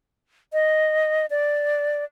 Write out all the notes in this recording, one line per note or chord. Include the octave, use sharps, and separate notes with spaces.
D#5
D5